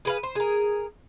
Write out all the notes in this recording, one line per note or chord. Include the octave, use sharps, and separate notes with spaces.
G#4 B4 F5
C5
G#4 A#4